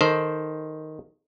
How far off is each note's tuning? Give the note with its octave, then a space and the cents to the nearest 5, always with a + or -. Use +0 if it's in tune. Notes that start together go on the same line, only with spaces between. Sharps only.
D#3 +0 A4 +0 C5 +0